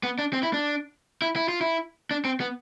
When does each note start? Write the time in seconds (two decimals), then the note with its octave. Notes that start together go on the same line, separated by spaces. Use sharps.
0.03 B3
0.19 D4
0.33 C4
0.43 E4
0.53 D4
1.22 E4
1.36 E4
1.49 F4
1.61 E4
2.11 D4
2.25 C4
2.40 B3